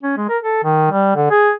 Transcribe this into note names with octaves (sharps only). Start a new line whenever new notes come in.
C#4
G#3
A#4
A4
D#3
G3
D3
G#4